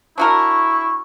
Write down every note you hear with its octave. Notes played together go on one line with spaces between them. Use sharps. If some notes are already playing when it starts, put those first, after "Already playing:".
D4 E4 F#4 A#4 C#6